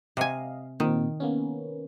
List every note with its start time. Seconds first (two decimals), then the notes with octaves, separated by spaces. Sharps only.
0.17 C3 D#5 F5 G#5
0.80 A#2 D#3 C4
1.20 A#3 B3 C#4